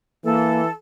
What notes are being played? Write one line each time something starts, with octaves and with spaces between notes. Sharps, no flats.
E3 A#3 A4